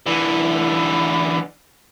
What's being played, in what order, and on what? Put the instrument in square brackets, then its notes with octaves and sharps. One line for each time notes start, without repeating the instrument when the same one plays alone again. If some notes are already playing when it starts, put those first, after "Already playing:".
[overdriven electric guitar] D3 E3